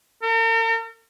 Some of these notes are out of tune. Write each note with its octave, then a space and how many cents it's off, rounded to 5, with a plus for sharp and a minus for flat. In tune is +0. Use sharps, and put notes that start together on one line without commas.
A#4 -45